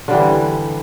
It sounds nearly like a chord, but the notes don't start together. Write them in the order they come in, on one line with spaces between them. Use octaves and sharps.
D3 G3 E3